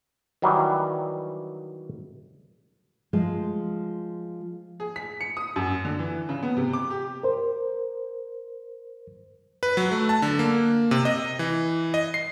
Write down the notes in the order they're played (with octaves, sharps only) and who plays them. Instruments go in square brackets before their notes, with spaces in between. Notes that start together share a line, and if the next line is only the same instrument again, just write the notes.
[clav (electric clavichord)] D#3 E3 F#3 G3
[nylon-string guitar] F3 G#3
[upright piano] G#4
B6
C#7
D#6
F#2
D3
E3
C#3
B3
C3
D6
G4
[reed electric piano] A#4 C5
[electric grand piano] B4
F#3
A3
A5
D3
A#3
C3
D#5
E3
D#5
C7